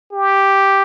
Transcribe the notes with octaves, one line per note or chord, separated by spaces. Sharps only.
G4